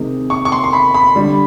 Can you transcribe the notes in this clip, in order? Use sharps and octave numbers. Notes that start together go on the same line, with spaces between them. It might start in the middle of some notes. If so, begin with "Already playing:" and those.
Already playing: C3 D#3 G#3
C#6
C#6
C6
C6
B5
B5
D3 G3